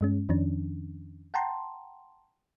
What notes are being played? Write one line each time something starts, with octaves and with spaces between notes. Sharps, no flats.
G2 G#3 C#4
F2 D#3 F3 C#4 D4
F#5 G5 A5 A#5 C6